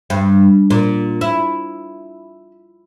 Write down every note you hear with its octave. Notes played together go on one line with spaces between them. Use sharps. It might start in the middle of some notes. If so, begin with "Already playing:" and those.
G2
A#2
E4